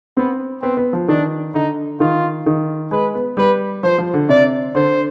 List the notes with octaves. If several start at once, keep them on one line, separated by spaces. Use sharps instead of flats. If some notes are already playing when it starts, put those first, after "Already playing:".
B3 C4
B3 C4
B3
F3
D#3 D4
D3 D#4
D#3 F4
D#3
G#3 B4
B3
G3 B4
F3 C5
F3
D3
C3 D5
D3 C5